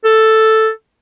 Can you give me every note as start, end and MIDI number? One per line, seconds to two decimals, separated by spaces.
0.05 0.70 69